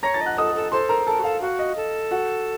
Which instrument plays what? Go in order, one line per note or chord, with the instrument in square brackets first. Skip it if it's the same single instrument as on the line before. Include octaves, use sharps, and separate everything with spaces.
[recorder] C#5 [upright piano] A#5 A#6
[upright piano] A5 A6
[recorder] D#5
[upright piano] F#5 F#6
[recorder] A4 [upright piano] D#5 D#6
[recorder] A4
[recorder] A4 [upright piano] C5 C6
[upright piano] A#4 A#5
[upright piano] A4 A5 [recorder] A#4
[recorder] F#4
[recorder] A4 [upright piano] F5
[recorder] F#4 [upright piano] F5
[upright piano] D#5
[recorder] A4
[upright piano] F#4 F#5